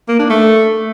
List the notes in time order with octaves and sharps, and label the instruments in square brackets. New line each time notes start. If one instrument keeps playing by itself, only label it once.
[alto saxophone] A#3
D4
A3